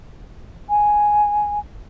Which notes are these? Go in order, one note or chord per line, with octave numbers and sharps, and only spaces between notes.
G#5